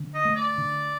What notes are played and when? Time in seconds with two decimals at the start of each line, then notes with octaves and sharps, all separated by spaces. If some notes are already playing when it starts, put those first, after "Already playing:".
Already playing: D3
0.15 D#5
0.25 A3
0.36 D5
0.58 D3